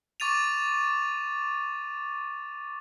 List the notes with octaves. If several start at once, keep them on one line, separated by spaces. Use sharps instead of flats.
C#6 D6 A6 D#7 F7